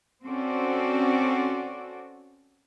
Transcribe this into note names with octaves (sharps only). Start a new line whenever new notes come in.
C4 C#4 F#4 A4 C5 D5